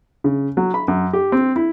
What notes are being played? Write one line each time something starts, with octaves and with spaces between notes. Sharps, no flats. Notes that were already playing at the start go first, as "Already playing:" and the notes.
C#3
F#3
B5
F#2
G4
C4
E4